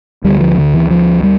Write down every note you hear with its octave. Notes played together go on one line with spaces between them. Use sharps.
D2 D3 G3
F3
D3
E3
F3
G3